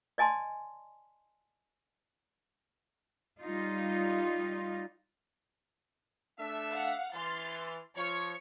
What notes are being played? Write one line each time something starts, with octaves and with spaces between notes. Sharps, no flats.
D5 D#5 G#5 A5 C6
G3 D#4 F4
A3 D4 E5
F5 F#5
E3 C6 F6 A6
F3 C#5 C#6